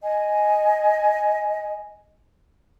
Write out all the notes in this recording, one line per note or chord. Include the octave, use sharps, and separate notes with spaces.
D#5 G#5